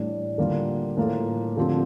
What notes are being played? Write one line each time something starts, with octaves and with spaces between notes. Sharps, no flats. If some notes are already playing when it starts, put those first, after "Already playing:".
Already playing: A2 E3 G3 D4
D3 G3 A#3 F4
A2 E3 A#3 F4 A4
D3 F3 C4 G4